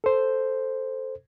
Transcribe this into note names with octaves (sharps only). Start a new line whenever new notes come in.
A4 C5